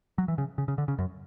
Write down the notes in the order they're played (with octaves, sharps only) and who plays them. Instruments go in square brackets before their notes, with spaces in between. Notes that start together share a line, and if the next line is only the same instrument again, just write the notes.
[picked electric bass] F#3
E3
C#3
C#3
C#3
D3
C#3
F#2